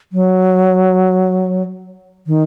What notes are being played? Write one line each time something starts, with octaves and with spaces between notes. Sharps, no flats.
F#3
D#3